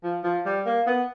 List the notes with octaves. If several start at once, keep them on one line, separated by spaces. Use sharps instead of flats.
F3
F3
G3
A#3
B3